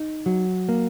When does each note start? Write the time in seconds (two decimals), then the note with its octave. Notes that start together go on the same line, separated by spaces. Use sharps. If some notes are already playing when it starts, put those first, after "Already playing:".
Already playing: D#4
0.26 F#3
0.69 A#3